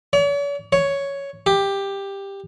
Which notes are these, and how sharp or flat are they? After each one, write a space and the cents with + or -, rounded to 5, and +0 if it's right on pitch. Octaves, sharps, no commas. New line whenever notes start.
C#5 +45
C#5 +5
G4 +10